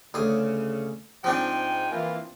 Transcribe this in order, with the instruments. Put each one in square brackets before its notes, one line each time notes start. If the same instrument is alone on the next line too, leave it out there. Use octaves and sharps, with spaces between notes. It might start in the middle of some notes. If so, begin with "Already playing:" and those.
[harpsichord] D2 G#4 [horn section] C#3
[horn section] G#2 G5 G#5 [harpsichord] F3 C4 D4
[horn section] E3 A#3 F4